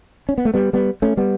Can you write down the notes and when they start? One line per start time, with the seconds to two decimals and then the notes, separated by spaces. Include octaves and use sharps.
0.29 C#4
0.38 B3
0.45 A3
0.54 G3 B3
0.73 G3 B3
1.02 A3 C#4
1.17 G3 B3